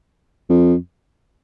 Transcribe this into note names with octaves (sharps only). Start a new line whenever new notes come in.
F2